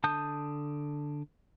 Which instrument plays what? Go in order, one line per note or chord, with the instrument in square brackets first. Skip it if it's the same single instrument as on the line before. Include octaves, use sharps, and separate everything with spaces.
[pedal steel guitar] D3 A5 D#6 G6